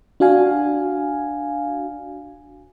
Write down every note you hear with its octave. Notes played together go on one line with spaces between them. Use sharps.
D4 F#4 F5 G#5